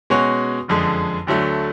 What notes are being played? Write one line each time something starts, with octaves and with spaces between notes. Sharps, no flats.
B2 G#3 C#4 F#4 C#5
F#1 F2 D3 G#3
D2 D3 F#3 A3